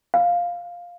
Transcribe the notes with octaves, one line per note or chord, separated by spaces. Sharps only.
F5